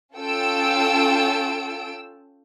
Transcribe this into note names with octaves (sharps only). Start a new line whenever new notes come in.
C#4 F4 A4 G5 E6 D7